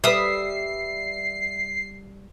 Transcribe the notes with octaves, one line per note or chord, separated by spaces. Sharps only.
G3 B4 E5 D#6 C7